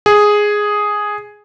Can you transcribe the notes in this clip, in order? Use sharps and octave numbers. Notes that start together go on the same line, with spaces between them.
G#4